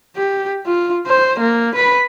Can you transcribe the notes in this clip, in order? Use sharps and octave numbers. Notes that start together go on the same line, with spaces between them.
G4
F4
C5
A#3
B4 B5